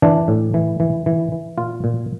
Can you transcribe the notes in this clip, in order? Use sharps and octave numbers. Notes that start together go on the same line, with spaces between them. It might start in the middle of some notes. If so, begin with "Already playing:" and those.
E3 D4
A2
E3
E3
E3
E3
A#2 F4
A#2